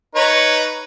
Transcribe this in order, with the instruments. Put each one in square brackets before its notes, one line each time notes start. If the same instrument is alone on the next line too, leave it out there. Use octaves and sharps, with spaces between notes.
[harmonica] D#4 B4 C#5